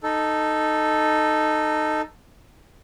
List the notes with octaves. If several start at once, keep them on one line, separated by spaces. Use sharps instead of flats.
D#4 A4